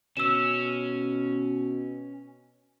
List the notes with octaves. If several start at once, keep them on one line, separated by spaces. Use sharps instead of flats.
B2 C#4 E6 E7